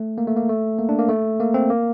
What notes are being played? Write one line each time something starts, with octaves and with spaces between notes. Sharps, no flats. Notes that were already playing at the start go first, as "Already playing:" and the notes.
Already playing: A3
A#3
A3
A#3
A3
A#3
D4
A#3
A3
A#3
C4
A#3